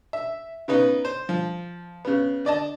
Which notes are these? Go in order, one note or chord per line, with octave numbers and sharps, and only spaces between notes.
E5
C#3 B3 D#4 B4
C5
F3
C#3 B3
D3 D5 D#5 A5